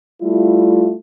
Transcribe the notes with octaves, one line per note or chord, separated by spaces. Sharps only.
G3 A3 E4 F4